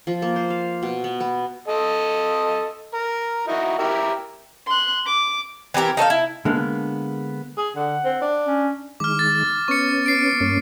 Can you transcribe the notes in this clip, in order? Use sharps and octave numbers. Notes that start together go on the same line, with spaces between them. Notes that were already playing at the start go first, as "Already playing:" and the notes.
F3
A#3
C5
F5
B2
B3
B3
A4 D#5
A#4
D#4 E4 F#4
E4 G4 A#4
C6 F#6
D6
E3 C4 G4 A#4
D#4 A4 C5 F5
E4
D3 G#3 A#3 B3
G#4
D3 F#5
C4
D4
C#4
D#3 G#3 D6 F6
A6
B3 C#4 C#6 C#7
C7 D7
G2 A#3 C#4